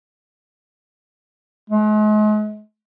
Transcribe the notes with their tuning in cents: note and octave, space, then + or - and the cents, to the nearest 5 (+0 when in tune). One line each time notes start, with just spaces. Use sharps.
G#3 +40